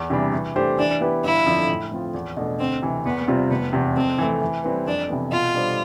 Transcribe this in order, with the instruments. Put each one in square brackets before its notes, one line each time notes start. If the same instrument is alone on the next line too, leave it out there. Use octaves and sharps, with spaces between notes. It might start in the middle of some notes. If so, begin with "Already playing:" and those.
Already playing: [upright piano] E2
C3 E3 G3 D4
E3
A3 D4 G4 C5
[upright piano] E3 [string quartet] D4
[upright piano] B3 E4 G4 B4
[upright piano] G1 [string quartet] E4
[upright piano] F2 D3 F3
A2
F3 C4 F4
E2
B2 A3 D4
[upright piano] D2 [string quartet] C4
[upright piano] C3 E3
[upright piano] E2 [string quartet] B3
[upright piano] C3 G3 C4 F4
[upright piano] F1 [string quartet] B3
[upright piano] E2 C3
[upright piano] F2 [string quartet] C4
[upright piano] E3 A3
E3
G3 C4 E4 B4
[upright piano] F2 [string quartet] D4
[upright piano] C3 E3 B3
[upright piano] B2 [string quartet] F4
[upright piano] G3 D4 A4 C5